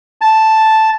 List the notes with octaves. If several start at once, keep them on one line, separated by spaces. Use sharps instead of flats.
A5